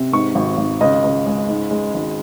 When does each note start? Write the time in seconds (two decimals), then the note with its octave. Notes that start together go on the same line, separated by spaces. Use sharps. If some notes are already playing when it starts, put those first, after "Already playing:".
Already playing: C3
0.12 G#2 C#6
0.35 G#1
0.57 G#1
0.81 C#2 D#5
1.04 C#2
1.26 G#3
1.49 G#2
1.71 G#3
1.94 G#1